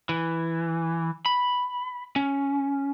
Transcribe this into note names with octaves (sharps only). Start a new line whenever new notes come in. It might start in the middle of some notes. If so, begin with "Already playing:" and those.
E3
B5
C#4